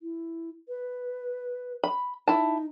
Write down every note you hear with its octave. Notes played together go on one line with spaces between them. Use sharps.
E4
B4
B5
D#4 E4 A5